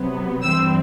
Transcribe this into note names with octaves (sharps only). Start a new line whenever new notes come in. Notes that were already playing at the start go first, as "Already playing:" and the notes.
Already playing: C3 F#3 B3
G2 E3 G3 C4 E6